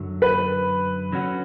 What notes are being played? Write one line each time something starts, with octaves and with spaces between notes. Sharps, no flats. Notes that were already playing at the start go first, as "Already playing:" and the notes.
Already playing: F#2 D3 F#3
B4
D3 F#3 C#4 F#4